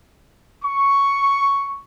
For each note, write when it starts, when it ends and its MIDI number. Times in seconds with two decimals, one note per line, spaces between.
0.63 1.82 85